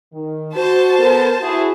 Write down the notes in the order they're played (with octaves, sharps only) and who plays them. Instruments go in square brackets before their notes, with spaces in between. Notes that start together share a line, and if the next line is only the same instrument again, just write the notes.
[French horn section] D#3
[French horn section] F#4 [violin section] C5 A5
[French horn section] B3 A4 A#4
E4 F#4 G#4